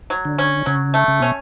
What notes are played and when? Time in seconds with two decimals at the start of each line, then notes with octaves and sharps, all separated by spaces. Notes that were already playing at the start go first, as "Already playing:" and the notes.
0.10 F#3
0.25 D3
0.38 C#4
0.66 C#3 F#3
0.94 A3
1.08 C#3
1.20 B2 C#4